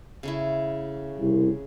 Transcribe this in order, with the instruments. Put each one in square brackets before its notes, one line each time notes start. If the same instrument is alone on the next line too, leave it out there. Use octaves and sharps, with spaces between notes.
[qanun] C#3 A3 E4
[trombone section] C2